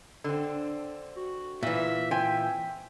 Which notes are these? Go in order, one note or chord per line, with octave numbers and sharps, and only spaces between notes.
D3 C4 D4
F#4
A#2 E3 E5
C4 E5 G5 G#5